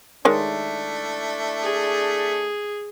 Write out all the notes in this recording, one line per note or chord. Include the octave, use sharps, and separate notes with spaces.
D#3 G#3 A3 D4 E4 C#5
G#4